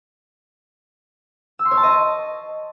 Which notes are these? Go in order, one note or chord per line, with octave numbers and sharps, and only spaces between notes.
E6
C6
C#5
A5
D#5